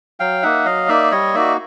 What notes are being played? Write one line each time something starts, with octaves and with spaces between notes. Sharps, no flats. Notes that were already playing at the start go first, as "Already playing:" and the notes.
F#3 F5 G5
A#3 D#4 E5 F#5
F#3 D#5 F5
A#3 D#4 D5 E5
G3 C#5 D#5
A#3 D#4 F#4 D5 E5